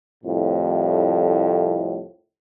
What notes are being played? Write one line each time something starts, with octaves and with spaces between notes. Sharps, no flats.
C2 F2 A2